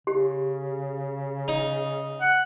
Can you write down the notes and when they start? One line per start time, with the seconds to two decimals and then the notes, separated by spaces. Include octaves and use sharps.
0.07 C#3 G4
1.48 D#4
2.21 F#5